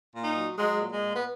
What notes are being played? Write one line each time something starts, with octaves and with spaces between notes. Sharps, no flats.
A#2
D#4
F#3
F#3 G#3
A#2
G#3
A#2
B3